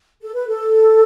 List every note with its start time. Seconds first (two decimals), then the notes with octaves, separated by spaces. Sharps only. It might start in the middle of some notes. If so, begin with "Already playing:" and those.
0.22 A4
0.35 B4
0.48 A4